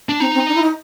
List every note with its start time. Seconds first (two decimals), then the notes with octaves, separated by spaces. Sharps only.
0.09 D4
0.20 C4 D#4
0.34 C4
0.48 D4
0.55 E4
0.62 D#4